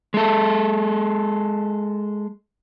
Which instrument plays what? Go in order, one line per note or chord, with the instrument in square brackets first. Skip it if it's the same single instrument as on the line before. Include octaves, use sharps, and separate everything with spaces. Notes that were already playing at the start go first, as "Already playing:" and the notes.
[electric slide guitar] G#3 A4